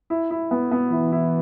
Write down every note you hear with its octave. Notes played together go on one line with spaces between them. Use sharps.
E4
E4
B3
B3
E3 E4
E4